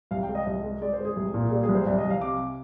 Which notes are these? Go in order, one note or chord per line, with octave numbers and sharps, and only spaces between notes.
C2 F5
G5
G#3
D#5
C2 D#5
G#3
G#3 D5
C5
G#3
G#4
C2
A#2
G3 G#4
G#4
C2
C5
C2 D5
D#5
C2
F5
C3 D6